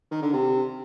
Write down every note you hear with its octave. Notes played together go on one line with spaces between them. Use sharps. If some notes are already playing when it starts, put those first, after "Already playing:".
D#3
D3
C3